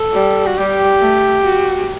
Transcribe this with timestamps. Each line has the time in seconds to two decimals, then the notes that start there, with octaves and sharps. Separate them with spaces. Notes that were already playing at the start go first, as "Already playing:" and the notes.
Already playing: A4
0.13 G3
0.46 F#4
0.57 G3 G4
1.01 A3
1.44 F#4